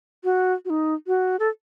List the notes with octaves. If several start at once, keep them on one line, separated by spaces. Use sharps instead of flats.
F#4
F#4
D#4
F#4
A4